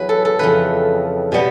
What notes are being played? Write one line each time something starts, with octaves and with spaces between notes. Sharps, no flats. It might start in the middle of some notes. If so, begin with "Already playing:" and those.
Already playing: E2 F#3 B4
A4
A4
F2 C#3 E3 B4
B2 G3 B3